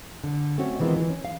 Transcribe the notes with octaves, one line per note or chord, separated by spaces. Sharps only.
D3
A3 C4 C#4 F#4
D#3 E3 G#3 B3 C4 F4
E3
C#4
F5